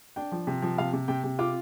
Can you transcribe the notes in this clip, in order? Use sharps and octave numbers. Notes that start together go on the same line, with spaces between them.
D4 G5
F3
C3
F3
C3 F5
C3
C3 G5
C3
F4 D6